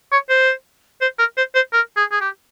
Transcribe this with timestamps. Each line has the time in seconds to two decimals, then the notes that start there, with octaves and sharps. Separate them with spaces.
0.12 C#5
0.30 C5
1.01 C5
1.19 A#4
1.37 C5
1.55 C5
1.73 A#4
1.97 G#4
2.12 G#4
2.21 G4